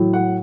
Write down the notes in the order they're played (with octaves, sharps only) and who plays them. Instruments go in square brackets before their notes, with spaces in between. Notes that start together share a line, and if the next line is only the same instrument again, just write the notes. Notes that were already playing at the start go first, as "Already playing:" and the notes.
Already playing: [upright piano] A2 F#3
F#5